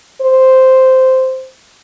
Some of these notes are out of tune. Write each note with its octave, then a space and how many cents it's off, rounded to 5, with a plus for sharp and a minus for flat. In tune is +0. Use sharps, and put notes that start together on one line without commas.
C5 -5